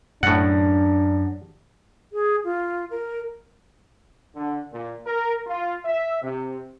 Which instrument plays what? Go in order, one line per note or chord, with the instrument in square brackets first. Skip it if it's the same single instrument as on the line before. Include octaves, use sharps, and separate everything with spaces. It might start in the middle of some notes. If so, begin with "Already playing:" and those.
[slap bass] F#2 [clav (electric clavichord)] A2 F#5 [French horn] D4
[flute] G#4
F4
A#4
[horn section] D3
A#2
A#4
F4
E5
C3